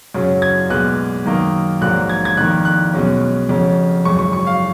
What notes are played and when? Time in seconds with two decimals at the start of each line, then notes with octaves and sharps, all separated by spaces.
0.14 F#2 C#3 F#3 C#4
0.42 G#6
0.70 B1 A#2 G#3 B3 F#6
1.26 F#2 D#3 A#3 D#4
1.81 A#1 G#2 F#3 A#3 F#6
2.09 G#6
2.25 G#6
2.37 F2 D#3 A#3 F#6
2.65 F#6
2.93 B1 B2 G#3 C#4
3.49 F2 C#3 F#3 C#4
4.05 G#1 F#2 C#3 C#6
4.19 C#6
4.33 C#6
4.47 F5